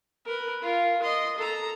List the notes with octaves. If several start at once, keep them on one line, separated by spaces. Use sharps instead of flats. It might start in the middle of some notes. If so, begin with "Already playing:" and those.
A#4 B4
F4 A#4
D#5 C6
A4 A#5